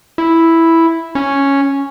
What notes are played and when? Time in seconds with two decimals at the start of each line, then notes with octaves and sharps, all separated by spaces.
0.18 E4
1.15 C#4